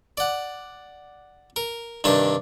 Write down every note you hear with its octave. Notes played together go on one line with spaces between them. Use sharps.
D5 F#5
A#4
G2 C3 D#3 D4 A5